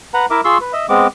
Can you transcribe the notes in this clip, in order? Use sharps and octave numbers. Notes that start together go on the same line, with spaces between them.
B4 F#5 A#5
E4 A#4 E5 D6
F4 G#4 C6 C#6 E6
B4
D#5 E5
G#3 B3 C4 D6